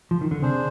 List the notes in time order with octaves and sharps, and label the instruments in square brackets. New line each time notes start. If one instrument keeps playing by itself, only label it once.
[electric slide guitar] F3
D#3
D3
[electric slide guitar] C3 [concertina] D4 G#4 C5